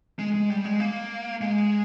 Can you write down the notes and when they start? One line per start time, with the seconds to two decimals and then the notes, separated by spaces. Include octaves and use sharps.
0.19 G#3
0.34 G#3
0.50 G3
0.65 G#3
0.80 A#3
1.41 G#3